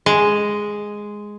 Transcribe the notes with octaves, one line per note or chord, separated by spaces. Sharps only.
G#3